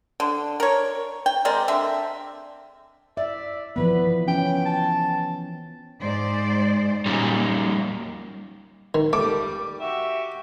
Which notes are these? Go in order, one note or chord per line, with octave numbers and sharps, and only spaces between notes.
D3
A#4 C#5
G5
G#3 C4 A#4 D5
D3 C4 E5
D5 E5
E3 F3 B3 B4
C#4 G5
A5
G#2 C5 D5
A#2 F#3 G3 A#3 C#4 D#4
D#3
G3 A3 D6
F#4 G4 E5